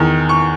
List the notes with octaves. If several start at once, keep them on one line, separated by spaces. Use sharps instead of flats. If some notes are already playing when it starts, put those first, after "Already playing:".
Already playing: E2 D#3
C#6